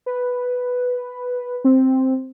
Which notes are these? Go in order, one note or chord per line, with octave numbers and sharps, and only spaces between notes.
B4
C4